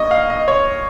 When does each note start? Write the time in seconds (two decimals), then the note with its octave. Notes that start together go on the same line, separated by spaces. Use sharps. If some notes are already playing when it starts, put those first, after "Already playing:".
Already playing: G2 A#3 D#5 C#6
0.11 F5
0.30 D#5
0.48 C#5